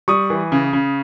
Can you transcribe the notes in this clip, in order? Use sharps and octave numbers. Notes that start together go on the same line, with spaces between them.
G3 C#6 D#6
E3
C#3
C#3